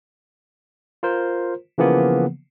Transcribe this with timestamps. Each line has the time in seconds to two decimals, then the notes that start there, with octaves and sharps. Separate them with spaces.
1.03 F4 A#4 C5
1.78 C#3 E3 F3 A#3 B3